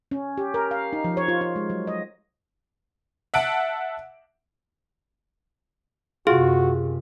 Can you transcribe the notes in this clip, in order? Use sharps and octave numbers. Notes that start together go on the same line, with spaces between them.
C#4
G4
A#4
F5
D#4
F3
C#5
F4
F4
G#3
F#3
D#5
E5 F#5 A5 D7
F#2 C3 F4 F#4 G#4